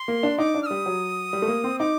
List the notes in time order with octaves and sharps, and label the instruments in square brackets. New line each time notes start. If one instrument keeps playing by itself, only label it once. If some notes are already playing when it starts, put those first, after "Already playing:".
Already playing: [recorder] C6
[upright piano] A#3
D4
[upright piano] D#4 [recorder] D6
[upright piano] D4
[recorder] F6
[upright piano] G3 [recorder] D#6
[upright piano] F#3
G3
A3
A#3
C4
[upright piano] D#4 [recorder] D6